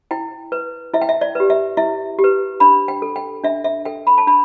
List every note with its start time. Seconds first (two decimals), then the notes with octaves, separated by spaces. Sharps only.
0.11 E4 G5
0.52 B4
0.94 E4 E5
1.02 G5
1.09 E5
1.21 D5
1.35 G4 B4
1.50 E5
1.77 E4 E5
2.19 G4
2.24 B4
2.60 D4 B5
2.88 G5
3.02 A4
3.16 G5
3.44 D4 E5
3.64 E5
3.85 A4 G5
4.07 B5
4.18 A5
4.27 D4 B5